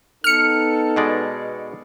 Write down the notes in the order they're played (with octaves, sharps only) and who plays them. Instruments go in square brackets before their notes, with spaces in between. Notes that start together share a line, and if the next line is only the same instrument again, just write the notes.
[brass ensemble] B3 D#4 A4 [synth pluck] F6 C#7
[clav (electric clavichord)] B2 G#3 D5